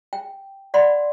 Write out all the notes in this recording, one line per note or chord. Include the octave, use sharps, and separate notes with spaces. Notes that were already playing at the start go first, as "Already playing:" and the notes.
G5
D5 F#5 B5 C6